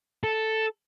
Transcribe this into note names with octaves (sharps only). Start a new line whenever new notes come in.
A4